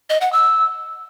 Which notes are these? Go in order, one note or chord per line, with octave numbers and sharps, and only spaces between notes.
D#5
F#5
E6